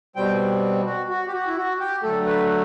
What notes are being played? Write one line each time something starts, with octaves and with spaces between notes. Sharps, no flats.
B2 G3 C4 G5
F#4
F#4
G4
F#4
E4
F#4
G4
D3 F#3 A3 A4
B4